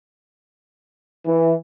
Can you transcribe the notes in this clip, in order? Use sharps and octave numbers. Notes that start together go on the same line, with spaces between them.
E3